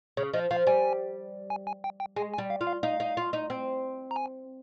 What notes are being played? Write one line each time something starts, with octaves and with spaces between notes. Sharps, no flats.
C#3 C#5
F3 D#5
F3 F5
G3 G#5
G#5
G#5
G5
G5
G#3 G#5
G#5
G3
F5
F4
F5
D#4 F5
D#4
F4
D#4
C4
A#5
G#5